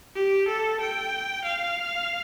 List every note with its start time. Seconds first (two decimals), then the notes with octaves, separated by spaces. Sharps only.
0.16 G4
0.48 A4
0.81 G5
1.45 F5